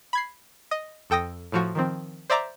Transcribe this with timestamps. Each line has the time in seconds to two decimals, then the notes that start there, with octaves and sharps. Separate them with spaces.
0.13 B5 G#6 C7
0.71 D#5
1.10 F2 A4 G5 D#6 A#6
1.52 A2 F3 F#4
1.75 D#3 F3 C4
2.30 C5 D5 E5 A#5 D6